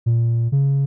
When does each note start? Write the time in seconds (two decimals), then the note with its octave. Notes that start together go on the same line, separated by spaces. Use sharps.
0.06 A#2
0.52 C#3